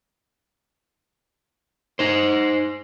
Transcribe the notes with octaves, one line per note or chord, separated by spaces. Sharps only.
D#4 C5